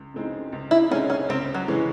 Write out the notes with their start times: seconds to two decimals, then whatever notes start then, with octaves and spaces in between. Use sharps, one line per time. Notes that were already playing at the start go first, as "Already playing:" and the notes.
Already playing: C#2
0.14 C#3 G#3 C4 D#4
0.53 C#2
0.71 E4
0.90 C#3 G#3 C4 C#4 D#4
1.10 C#4
1.29 C#2 C4
1.55 F#3
1.67 C#3 E3 G#3 C#4